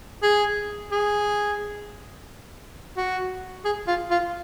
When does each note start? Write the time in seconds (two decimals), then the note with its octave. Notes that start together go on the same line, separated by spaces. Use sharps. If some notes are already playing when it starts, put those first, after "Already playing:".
0.23 G#4
0.91 G#4
2.97 F#4
3.65 G#4
3.87 F4
4.11 F4